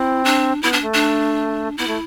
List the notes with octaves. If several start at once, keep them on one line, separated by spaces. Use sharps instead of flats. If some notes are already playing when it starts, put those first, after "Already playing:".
Already playing: C4 E4
D4
B3 E4
D4
A3
D4
B3 E4
A3